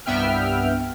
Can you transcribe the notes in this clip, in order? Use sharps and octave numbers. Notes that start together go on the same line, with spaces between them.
C2 G2 B3 E5 G5 F6